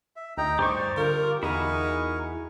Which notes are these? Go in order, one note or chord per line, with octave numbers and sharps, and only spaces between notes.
E5
D2 D#4 G5 A#5
G2 G4 C5 D5 C#6
D3 F4 A#4
E2 D#4 E4 F#4 G#4 A#4 C#6